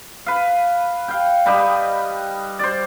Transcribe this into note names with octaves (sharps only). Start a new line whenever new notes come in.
B4 F5
F5 G5
G3 D#4 B4 D#5
C5 D5